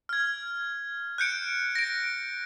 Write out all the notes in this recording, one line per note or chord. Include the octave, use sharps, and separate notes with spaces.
F6 G#6
F#6 G6 C#7 D7
A#6 D7